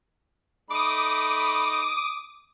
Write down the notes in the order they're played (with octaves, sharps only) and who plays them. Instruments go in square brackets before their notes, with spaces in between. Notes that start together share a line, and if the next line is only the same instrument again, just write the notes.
[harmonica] A3 D#4 B5 [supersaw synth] D6 D#6